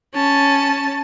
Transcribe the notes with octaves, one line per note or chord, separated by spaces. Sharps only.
C#4 A5